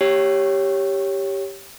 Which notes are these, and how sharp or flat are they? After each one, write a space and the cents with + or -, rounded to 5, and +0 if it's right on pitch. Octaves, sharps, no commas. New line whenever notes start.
G4 +0 C#5 +0